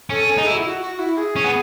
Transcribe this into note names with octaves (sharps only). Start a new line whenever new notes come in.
C#4 A4
A4
D#4 G#4
E4
F#4
F#4
F#4
E4
G#4
C#4
B3